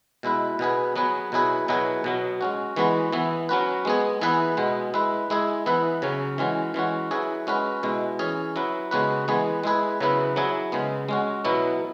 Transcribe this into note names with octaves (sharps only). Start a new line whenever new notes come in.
B2 G#3 E4 B4
B2 B3 G#4 B4
F#3 B3 G#4 B4
B2 F#3 E4 G#4 B4
B2 F#3 E4 G#4 B4
B2 F#3 B3
G#3 C#4 F#4
E3 G#3 B3 F#4 B4
E3 B3 E4
F#3 C#4 F#4 B4
G#3 B3 G#4
E3 B3 E4 G#4 B4
B2 G#3 B3
G#3 E4 B4
G#3 E4 G#4
E3 B3 E4 B4
C#3 F#3 C#4
E3 G#3 C#4 F#4
E3 G#3 C#4 F#4
F#3 E4 G#4 B4
G#3 C#4 F#4 B4
B2 G#3 E4
E3 C#4 G#4
F#3 E4 B4
C#3 G#3 B3 F#4 B4
E3 G#3 B3 G#4 B4
G#3 E4 G#4 B4
C#3 F#3 B3 E4 B4
F#3 E4 G#4
C#3 G#3 B3
G#3 C#4 F#4
B2 F#3 B3 E4